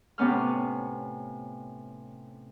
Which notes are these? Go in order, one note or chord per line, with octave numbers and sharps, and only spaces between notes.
A2 C3 B3 C#4 F6